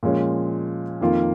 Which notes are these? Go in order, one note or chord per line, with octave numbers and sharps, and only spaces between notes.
A#2 F3 G#3 C#4
F2 D#3 A#3 F4